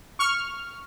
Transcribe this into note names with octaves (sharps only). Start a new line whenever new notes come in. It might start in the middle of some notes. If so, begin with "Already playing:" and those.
C#6 F6